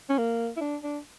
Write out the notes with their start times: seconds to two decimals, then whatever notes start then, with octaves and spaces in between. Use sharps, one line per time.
0.10 C#4
0.18 A#3
0.57 E4
0.61 D4
0.84 D4